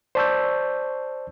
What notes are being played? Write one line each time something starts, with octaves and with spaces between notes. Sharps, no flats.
C5 D5 A5 C#6 E6 G6